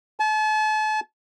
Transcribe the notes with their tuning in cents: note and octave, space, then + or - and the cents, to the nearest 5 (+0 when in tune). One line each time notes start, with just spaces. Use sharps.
A5 -40